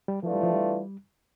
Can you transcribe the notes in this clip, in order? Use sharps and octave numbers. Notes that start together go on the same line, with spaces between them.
G3
E3 F3 A3 D4 F4
G3
F3
G3